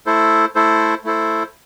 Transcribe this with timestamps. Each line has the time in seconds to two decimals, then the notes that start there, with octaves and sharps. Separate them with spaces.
0.06 A3 E4 A4 C5
0.55 A3 E4 A4 C5
1.04 A3 E4 A4 C5